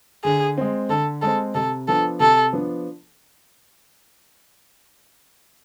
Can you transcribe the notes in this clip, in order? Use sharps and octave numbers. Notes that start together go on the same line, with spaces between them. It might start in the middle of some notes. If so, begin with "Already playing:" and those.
D3 G#4
G#3 C4
D3 A4
G#3 C4 A4
C3 A4
F3 B3 D4 A4
C3 A4
F3 B3 D4